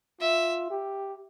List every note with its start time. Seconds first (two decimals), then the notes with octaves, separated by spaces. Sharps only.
0.21 F4 E5
0.70 G4